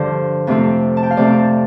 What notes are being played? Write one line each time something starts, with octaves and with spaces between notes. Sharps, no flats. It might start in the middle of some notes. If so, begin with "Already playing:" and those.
Already playing: G2 D3 F3 C5
F2 C3 A3 C4 F4
A5
G5
F5
F2 C3 A3 C4 F4 D5